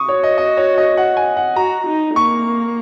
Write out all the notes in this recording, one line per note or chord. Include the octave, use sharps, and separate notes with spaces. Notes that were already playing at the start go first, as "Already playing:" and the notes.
Already playing: C#6 D#6
F#4 C#5
D#5
D#5
C#5
D#5
F#5
G#5
F#5
F#4 A#5
D#4
A#3 C#6